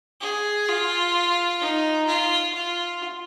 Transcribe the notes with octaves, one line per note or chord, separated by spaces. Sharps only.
G#4
F4
D#4
F4
F4